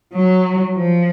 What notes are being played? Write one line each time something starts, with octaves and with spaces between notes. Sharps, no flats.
F#3
F3